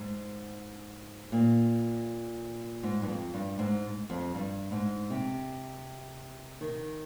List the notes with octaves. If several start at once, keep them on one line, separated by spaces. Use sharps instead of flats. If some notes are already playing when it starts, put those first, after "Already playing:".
Already playing: G#2
A#2
G#2
G2
F2
G2
G#2
F2
G2
G#2
C3
D#3